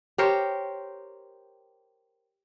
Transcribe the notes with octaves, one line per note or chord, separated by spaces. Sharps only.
G4 A#4 C5 C#5